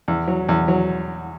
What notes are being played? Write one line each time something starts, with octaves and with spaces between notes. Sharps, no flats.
E2
F#3
E2
F#3